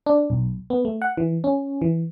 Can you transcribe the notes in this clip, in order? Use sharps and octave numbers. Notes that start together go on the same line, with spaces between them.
D4
B1
B3
A3
F#5
E3
C#4
E3